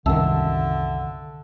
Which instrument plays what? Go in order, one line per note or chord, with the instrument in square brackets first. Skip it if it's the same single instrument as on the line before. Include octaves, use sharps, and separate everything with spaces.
[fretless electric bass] C2 F#2 D#3 [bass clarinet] D3 [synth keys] E5 A5 E6